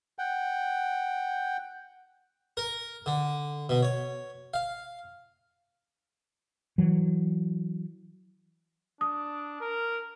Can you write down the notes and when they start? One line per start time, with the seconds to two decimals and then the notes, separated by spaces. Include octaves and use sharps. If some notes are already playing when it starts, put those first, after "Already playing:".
0.19 F#5 G5
2.57 A#4
3.06 D3
3.69 B2
3.82 C#5
4.54 F5
6.78 E3 F#3
9.01 D4 D#6
9.61 A#4